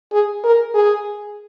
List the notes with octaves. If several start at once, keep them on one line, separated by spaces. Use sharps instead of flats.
G#4
A#4
G#4